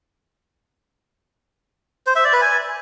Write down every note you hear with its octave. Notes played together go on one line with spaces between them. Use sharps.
C5
E5
D5
B4
G#5